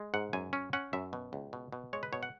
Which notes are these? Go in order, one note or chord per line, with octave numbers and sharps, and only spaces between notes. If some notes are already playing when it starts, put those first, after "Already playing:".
Already playing: G#3
G#2 F#5
F#2 G#5
C#4
C#4 F#5
F#2 E5
B2
C#2
B2
B2
G#3 C#5
B4
B2 C#5
F#5